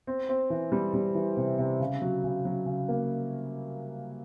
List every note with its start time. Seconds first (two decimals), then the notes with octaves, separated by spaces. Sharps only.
0.07 C4
0.29 C4
0.50 E3
0.72 G3
0.94 G3
1.15 E3
1.37 C3
1.58 C3
1.80 C#3
2.02 F#3
2.24 C#3
2.45 F#3
2.66 C#3
2.89 A#3